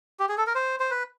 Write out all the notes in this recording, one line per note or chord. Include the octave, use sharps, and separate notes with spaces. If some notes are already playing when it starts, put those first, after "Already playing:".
G4
G#4
A4
A#4
C5
C5
B4